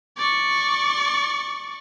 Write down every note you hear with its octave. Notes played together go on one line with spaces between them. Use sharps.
D5 C#6